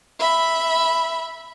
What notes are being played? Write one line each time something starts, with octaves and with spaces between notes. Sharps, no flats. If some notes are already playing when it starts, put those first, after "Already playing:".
E5 B5